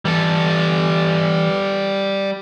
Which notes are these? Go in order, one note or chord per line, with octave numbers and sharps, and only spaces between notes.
E3 G3 A4